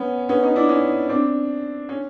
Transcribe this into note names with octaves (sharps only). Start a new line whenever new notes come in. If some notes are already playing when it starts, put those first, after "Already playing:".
Already playing: B3 C#4
B3 C#4
C#4 D#4
D4 E4
C#4 D#4
C4 D4
C#4